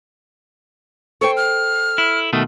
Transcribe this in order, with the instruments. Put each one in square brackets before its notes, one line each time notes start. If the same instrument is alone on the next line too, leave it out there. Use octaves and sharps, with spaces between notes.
[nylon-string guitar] A4 C5 G5 [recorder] C#6
[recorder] F6
[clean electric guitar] E4
B2 D#3 A3